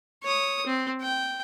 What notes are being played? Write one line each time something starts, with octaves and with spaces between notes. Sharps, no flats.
C#5 D#6
C4
G5